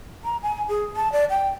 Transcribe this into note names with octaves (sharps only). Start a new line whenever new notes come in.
A#5
G#5
G#4
A5
D5
G5